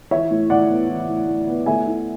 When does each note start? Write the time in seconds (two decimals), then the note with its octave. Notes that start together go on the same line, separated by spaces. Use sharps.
0.11 E3 C#5 E5
0.31 A2
0.50 A2 D5 F#5
0.70 B3
0.89 E3
1.08 A2
1.27 A2
1.48 B3
1.66 A3 E5 G#5
1.86 E4